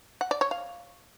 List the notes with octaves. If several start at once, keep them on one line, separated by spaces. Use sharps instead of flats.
F#5
D5
C#5
F5